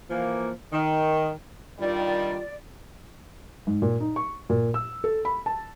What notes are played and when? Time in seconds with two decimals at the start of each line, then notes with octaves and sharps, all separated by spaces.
0.10 E3 F3 A#3
0.73 D#3
1.79 G2 D#3 G3 F4 D5
3.67 G#2
3.82 A#2
4.00 D#4
4.16 C#6
4.50 A#2
4.74 E6
5.04 A4
5.25 B5
5.46 A5